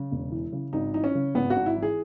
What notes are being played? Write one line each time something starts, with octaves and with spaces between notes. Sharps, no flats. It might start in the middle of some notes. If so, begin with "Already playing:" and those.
Already playing: C#3
E1
E3
C#3
G#1 D#4
E3 D#4
C#4
C#3
G#1 B3
F#4
G#1
E4
E3
G#4